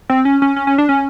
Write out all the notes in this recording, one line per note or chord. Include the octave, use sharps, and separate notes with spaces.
C4
C#4
C#4
C#4
C#4
D4
C#4